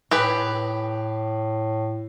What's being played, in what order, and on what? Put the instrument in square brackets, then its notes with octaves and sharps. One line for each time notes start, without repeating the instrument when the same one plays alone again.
[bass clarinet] A2 [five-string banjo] G4 G#4 B4